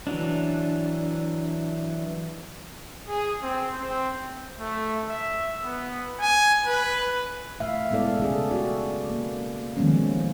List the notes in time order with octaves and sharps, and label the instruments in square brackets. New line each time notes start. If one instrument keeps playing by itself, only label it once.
[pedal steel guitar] E3 F#3 D4
[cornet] G#4
C4
C4
[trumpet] A3
E5
B3
G#5
B4
[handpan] A3 E5 F5
G#3 B3 E4 A4 D5
C#3 C#4 G#4 A4
F#4 G4 D5
A#3
D#3 F3 G#3 A#3 B3 C#4